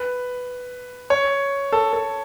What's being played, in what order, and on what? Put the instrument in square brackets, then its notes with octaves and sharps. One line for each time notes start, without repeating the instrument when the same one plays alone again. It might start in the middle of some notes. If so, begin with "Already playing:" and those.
Already playing: [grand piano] B4
C#5
A4
A4